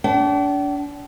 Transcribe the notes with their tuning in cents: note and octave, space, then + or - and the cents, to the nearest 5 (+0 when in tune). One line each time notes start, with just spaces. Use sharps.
D4 -35 G5 -45